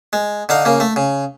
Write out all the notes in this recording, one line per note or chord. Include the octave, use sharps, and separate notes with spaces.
G#3
D3 D#4 F5
C#3 A#3
A3
C#3